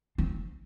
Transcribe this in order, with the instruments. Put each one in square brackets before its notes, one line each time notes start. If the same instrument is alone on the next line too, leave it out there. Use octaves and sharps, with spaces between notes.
[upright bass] C4